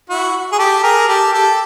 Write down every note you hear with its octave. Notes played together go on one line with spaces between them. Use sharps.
E4 F#4
G#4
G4 A4
G#4 A#4
G4 A4
G4 A4